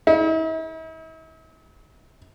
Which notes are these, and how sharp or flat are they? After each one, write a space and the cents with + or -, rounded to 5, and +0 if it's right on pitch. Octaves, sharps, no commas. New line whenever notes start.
E4 -45